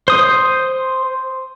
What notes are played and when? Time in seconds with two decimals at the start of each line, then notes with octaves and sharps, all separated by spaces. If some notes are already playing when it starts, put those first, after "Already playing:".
0.08 C5 D#6